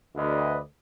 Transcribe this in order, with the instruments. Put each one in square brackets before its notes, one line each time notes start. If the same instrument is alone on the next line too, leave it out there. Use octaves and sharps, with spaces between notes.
[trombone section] D2 [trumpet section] B4 D5 D#5